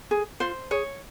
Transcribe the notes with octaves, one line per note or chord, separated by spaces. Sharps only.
G#4
F4 C5
G#4 C#5